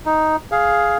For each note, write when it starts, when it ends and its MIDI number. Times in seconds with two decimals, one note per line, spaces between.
0.06 0.36 63
0.52 0.98 68
0.52 0.98 77